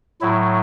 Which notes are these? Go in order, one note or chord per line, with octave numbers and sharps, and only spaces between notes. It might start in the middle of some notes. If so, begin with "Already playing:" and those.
A2 F#3 E4